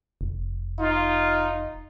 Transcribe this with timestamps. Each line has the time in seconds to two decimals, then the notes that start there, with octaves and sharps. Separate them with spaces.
0.21 F1
0.79 D#4 F4